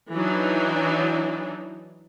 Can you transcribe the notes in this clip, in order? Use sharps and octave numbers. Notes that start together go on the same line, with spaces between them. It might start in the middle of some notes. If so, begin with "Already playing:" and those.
E3 F#3 D4 D#4